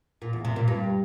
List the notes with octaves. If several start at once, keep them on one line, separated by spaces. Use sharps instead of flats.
A#2
E2
C3
A#2
G2